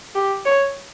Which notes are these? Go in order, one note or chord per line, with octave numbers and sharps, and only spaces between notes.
G4
C#5